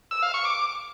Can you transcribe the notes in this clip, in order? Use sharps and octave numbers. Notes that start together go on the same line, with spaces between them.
E6
F5
C#6
D6